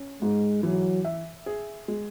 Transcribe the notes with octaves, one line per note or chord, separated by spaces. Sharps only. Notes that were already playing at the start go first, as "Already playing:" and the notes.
Already playing: C#4
G#2 G#3
E3 F#3
E5
G#4
G#3